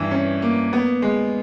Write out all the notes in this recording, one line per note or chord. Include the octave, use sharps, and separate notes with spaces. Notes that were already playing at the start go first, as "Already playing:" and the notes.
Already playing: G2 E3
C#4
A#3
B3
G#3